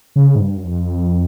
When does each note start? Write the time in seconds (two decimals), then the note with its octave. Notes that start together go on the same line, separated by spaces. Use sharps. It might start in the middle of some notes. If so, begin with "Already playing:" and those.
0.16 C#3
0.35 G#2
0.40 G2
0.57 F#2
0.64 F2